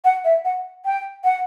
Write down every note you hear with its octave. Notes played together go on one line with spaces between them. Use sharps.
F#5
E5
F#5
G5
F#5